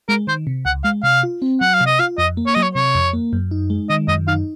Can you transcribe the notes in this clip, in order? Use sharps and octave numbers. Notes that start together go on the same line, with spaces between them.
G#3 A#4
D#3 C5
C3
C#2 F#5
G#3 F5
C3 F5
F4
C4
F#3 F#5
F5
C3
D#5
F4 F5
F2 D#5
A#3
C#5
F#3 D#5
C#5
C3 C#5
F2
A#3
F#2
D#4
G#3
D#3 D#5
F#2 D#5
D#4 F5